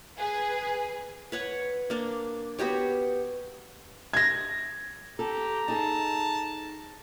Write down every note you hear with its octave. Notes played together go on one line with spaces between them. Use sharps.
G#4 B4
B4 C#5 F#5
A#3 D4
B3 F#4 G4 C#5
G#6 A#6
G4 A4 A#5
D#4 G#4 A4 A5